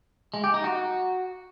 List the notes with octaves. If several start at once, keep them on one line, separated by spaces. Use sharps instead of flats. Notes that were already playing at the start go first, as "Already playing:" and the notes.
G#3
G4
D#4
F#4